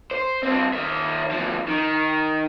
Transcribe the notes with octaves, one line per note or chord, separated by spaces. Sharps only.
C5
G2 C4
D#2 E5
D2 F3
D#3